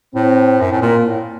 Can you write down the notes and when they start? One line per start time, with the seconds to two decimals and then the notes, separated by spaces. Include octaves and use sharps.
0.15 A2 C4
0.61 F#2
0.71 A2
0.82 A#2 A#3
1.04 A2